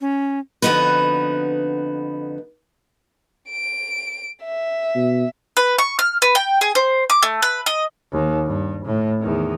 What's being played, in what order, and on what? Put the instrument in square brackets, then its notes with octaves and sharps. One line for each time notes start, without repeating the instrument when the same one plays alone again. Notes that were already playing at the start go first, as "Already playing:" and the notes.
[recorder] C#4
[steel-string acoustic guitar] F2 D3 B3 D#4 F#4 B4
[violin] D7
E5
[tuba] B2
[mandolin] B4
C#6
F6
B4
G5
G#4
C5
D6
A3
B4
D#5
[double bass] D#2
G2
A2
E2 D#3